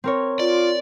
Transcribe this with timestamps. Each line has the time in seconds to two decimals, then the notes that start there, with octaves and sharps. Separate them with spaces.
0.04 C4 A#4 C#5
0.40 F4 D5